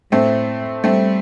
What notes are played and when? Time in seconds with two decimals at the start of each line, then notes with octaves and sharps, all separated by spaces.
0.12 A2 A3 C4
0.84 G3 A3 C4